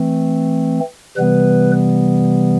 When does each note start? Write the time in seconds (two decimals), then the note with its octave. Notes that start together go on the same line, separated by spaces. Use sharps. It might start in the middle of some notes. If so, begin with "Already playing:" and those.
Already playing: E3 A3 C4
1.17 C3 E3 G3 B3 B4